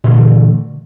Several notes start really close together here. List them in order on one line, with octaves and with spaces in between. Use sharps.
A#2 D3 A3 E3